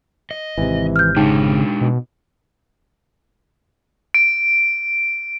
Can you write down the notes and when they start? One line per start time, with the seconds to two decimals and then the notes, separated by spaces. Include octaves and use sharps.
0.31 D#5
0.58 G#1 C3 E3
0.96 F6 G6
1.16 C#3 G#3 D4 D#4 G5
1.81 B2
4.14 D7